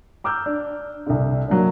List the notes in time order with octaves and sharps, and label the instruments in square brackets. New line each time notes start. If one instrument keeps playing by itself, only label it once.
[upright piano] A#5 D6 E6 F6 G6
D4
C2 D3
F#3 A#3 D4